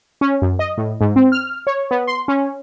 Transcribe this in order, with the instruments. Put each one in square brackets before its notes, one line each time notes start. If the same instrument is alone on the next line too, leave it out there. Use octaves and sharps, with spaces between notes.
[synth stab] C#4
F#2
D#5
A2
G#2
C4
F6
C#5
B3
C6
C#4